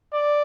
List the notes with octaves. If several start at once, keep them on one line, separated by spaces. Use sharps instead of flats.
D5